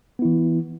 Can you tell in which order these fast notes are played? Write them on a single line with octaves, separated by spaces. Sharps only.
B3 E4 E3